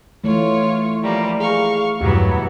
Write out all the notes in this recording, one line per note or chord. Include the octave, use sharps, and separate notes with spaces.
E3 A3 F4 C#5
F3 G3 A#3
G#4 F5 C#6
E2 G2 B2 E3 F#3 B3 G4